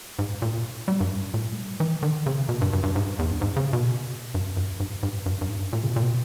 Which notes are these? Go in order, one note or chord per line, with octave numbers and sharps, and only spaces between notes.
G#2
A#2
G3
G2
G#2
A#2
G#3
G3
E3
D#3
C#3
B2
G2
G2
G2
G#2
G2
E2
G2
G#2
C#3
B2
G2
G2
G#2
G#2
G2
G2
G#2
G2
A#2
C#3
B2
A#2
B2